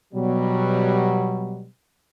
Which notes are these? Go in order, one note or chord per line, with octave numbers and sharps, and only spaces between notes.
B2 F#3 G3